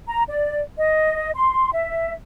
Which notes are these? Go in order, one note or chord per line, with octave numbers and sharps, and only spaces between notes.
A#5
D5
D#5
C6
E5